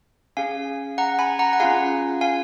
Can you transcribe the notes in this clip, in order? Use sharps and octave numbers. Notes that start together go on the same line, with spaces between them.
C#4 G#4 F5 G#5
F#5 A#5
G#5 B5
F#5 A#5
F#5
C#4 F4 G#4 F5 G#5
F5 G#5